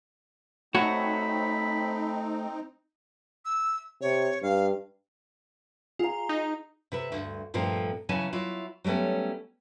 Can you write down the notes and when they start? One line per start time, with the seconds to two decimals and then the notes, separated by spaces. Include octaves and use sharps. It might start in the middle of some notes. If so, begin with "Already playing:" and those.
0.75 A3 C4 D#4 F#4 C#5 F#5 B5
3.45 E6
4.01 C3 C#5
4.42 G2 F5
5.99 F4 G#4 A#5
6.29 D#4
6.92 C3 B4 E5
7.12 D2 G2
7.54 G2 A#2 F3 A3 C4 A#4
8.09 C#3 E3 F#3 C#4 G#5 A5
8.33 F#3 E4 F4
8.84 F#3 G3 A3 B3 C#4